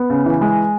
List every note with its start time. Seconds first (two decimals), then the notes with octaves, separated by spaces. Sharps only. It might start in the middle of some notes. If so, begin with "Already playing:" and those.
Already playing: B3
0.10 C#3
0.26 E3
0.41 G#3